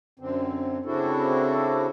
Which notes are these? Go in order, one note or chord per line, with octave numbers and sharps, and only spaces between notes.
F#2 D3 C4
C#3 C4 D4 E4 F#4 A4